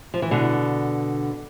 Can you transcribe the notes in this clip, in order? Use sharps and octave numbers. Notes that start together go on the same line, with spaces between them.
F3
E3
B2 D3